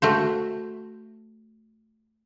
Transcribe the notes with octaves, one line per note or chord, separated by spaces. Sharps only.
A3 F#4 C5